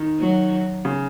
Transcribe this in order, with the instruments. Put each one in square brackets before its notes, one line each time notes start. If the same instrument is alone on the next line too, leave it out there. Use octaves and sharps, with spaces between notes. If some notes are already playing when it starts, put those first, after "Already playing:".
Already playing: [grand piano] D#3
[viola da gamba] F#3
[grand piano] C#3